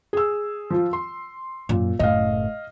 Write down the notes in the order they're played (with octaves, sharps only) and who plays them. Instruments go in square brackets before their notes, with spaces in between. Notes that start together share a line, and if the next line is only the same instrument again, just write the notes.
[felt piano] G#4 E6
F3 F4
C6
[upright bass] F#2 [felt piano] A#2
[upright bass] F#1 A2 [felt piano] D#5 F5